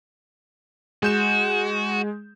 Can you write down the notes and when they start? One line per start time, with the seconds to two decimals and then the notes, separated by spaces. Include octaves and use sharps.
1.03 G#3 F#4 G6 E7